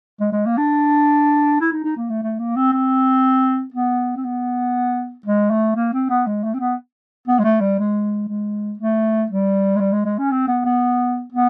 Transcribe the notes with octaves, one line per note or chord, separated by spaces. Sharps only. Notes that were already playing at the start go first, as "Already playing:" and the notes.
G#3
G#3
A#3
D4
E4
D#4
D#4
A#3
A3
A3
A#3
C4
C4
B3
C4
B3
G#3
A3
A#3
C4
B3
G#3
A3
C4
B3
B3
G#3
A3
G3
G#3
G#3
A3
G3
G#3
G3
G#3
G#3
C#4
C4
B3
B3
B3